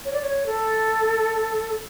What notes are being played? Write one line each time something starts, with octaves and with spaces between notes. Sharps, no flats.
C#5
D5
C#5
A4